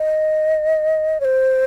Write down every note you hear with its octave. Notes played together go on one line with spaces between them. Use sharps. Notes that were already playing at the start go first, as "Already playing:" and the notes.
Already playing: D#5
C#5
C5